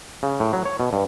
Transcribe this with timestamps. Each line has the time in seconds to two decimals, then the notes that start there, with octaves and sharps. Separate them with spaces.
0.23 C#3
0.40 A2
0.53 F#3
0.65 C#5
0.80 B2
0.93 G2